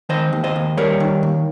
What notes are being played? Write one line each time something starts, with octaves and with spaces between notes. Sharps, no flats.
D#3 C5 D#5
D#2
C5 D#5
D#2
G3 A#4 C#5
D#3
D#2